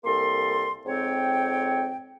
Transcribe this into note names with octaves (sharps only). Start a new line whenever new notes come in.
C2 A#3 A4 C6
F2 G#2 C4 C#5 G5